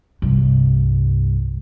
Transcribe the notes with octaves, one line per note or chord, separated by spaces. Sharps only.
C2 G2